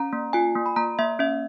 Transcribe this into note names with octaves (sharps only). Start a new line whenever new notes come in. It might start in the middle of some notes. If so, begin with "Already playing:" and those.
Already playing: C#4 A#5
A#3
F4 G#5
A#3
B5
A#3 A#5
A#3 E5
C#4 E5